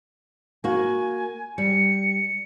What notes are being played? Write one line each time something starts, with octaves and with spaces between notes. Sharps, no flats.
A#3 F#4 G#5
G3 C#7